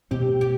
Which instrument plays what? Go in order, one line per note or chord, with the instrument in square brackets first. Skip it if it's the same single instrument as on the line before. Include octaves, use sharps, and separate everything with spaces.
[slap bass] B2 A3 C4 [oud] G4
[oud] G4